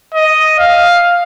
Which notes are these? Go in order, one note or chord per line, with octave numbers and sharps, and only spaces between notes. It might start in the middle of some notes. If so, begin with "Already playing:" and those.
D#5
F5